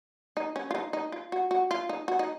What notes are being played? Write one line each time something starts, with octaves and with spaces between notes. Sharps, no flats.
D#4
C#4
F4
D#4
D#4
F4
F#4
F#4
F4
D#4
F#4
D#4